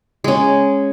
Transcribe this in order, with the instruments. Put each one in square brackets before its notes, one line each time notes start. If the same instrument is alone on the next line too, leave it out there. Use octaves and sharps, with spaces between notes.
[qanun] G#3 C#4